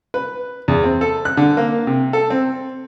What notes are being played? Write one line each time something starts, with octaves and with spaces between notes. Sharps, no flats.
B4
E2
C4
A4
F#6
D3
A#3
C3
A4
C4